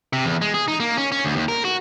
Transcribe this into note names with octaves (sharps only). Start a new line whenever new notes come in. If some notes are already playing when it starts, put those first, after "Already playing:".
C3
E2
G#3
G#4
D#4
A#3
C#4
C#4
D2
D#2
A#4
F#4